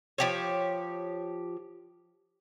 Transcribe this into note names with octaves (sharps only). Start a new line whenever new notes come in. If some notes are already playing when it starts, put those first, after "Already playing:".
F3 G4 C#5